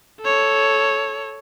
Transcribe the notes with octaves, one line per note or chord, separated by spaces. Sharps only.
A4 C#5